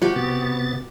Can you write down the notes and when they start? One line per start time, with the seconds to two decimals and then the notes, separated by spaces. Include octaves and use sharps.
0.02 F3 G3 F#4 G4
0.16 C3 B3 A6